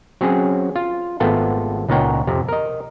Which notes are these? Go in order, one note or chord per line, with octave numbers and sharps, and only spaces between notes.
F#3 C4 C#4 G#4
F4
G#1 A3 B3 F4 A4 G5
C#2 A#2 D#4 C#5 F#5 G5
F2 C3
A#4 D#5